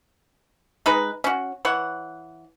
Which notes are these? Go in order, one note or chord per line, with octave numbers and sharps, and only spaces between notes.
G#3 D#4 B4
C#4 F#4
E3 C#5 F#5